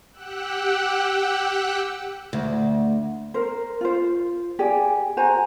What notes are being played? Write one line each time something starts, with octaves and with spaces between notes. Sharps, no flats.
G4 F#5 G5 E6 F#6
D2
A#4 C5
F4 C5
G4 G#4 D5
F#4 C5 G#5 A#5